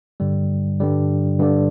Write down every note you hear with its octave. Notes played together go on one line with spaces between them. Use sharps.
G2 D3 G3
G2 D3 G3
G2 D3 G3